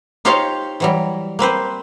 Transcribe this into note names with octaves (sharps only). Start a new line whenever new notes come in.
D#4 F4 G4 C5 C#5 F5
E3 F#3 G3
A#3 C4 B4 C5